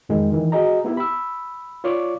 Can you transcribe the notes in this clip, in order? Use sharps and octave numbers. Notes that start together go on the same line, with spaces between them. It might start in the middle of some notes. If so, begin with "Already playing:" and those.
F2 D#3 G#3
D#3 E3
F#4 G#4 D#5 A#5
B3 E4 G4
B5 E6
F4 C#5 D5 C#6 D6